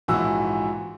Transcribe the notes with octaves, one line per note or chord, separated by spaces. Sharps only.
A#1 G#2 E3 F#4 E6